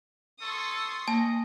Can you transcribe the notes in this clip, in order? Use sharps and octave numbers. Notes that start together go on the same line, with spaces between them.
A4 C6 C#6 D#6
A#3 D#5 A5